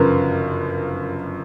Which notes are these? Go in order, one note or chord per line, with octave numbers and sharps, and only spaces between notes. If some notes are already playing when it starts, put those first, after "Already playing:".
Already playing: G1 F#2 C#3 F3 A#4 B4